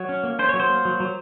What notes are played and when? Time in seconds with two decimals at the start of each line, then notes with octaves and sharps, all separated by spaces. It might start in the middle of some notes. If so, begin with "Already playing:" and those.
Already playing: F#3 C#5
0.09 C#4
0.24 A#3
0.39 C#4 C5
0.49 F#3 C#5
0.60 C5
0.69 A#3
0.85 F#3
1.00 F#3